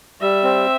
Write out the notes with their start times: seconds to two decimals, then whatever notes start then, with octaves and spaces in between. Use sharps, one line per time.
0.21 G3 E5
0.43 C4